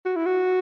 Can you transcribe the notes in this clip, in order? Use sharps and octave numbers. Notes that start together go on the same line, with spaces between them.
F#4
E4
F#4